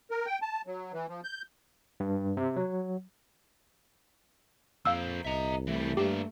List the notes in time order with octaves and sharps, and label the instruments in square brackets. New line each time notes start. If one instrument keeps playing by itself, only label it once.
[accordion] A#4
G5
A5
F#3
E3
F3
G6
[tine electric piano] G2
C3
F#3
[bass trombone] F2 [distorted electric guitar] A#3 C5 [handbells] F5 E6
[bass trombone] C2 [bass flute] D#5 [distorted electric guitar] E5 A#5
[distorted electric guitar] E3 G3 [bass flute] A3
[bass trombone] G2 [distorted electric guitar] A#3 E5 [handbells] G4